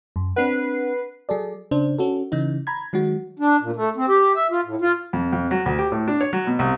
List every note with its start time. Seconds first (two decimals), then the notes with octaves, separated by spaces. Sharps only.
0.16 F#2
0.36 C4 D4 B4 F#5 C7
1.29 F#3 G#4 A4 D5
1.71 C#3 D4 C5
1.98 C#4 F#4 A4
2.32 C#3 E3 D#4
2.67 A#5 B5 G#6
2.93 D#3 F#3 G#3 F#4
3.40 D4
3.62 A#2
3.76 A3
3.97 C4
4.09 G4
4.35 E5
4.51 F4
4.65 A2
4.81 F4
5.13 F2
5.32 F2
5.51 F#3
5.66 D2
5.79 G4
5.92 A2
6.08 D4
6.21 C#5
6.33 F#3
6.47 B2
6.59 C2